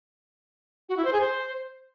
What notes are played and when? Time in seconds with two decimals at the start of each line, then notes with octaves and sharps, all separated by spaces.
0.89 F#4
0.97 E4
1.05 C5
1.13 G#4
1.21 C5